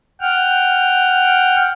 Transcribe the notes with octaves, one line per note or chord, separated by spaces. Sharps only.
F#5 G5 F6